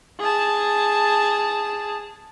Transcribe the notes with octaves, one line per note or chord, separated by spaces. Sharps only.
G#4 A5